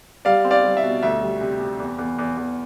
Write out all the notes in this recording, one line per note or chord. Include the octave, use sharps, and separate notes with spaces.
G3 D5 F5
C4
D5 F5
G3
E5
B2
D2 E5
G3
C3
C3
E2
E2
E2
E2